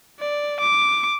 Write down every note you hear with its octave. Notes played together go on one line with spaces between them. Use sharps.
D5
D6